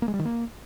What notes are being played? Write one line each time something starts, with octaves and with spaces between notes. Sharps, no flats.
A#3
G#3
G3
D#3
A#3